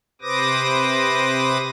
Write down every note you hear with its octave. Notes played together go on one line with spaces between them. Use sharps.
C3 B4 C5 D6 D#6 A#6